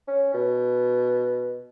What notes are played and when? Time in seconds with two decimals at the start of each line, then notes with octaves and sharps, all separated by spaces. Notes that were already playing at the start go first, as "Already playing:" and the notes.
0.08 C#4
0.34 B2